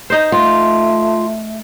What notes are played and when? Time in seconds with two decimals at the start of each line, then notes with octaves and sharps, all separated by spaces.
0.10 D#4 C5
0.32 A3 F4